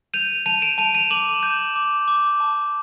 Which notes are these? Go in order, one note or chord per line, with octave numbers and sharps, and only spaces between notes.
G6 D#7 F7
A5 D#7 F7
D7 E7
A5 D#7 F7
D#7 F7
D6 E7 F#7
G6
D6
D6
A5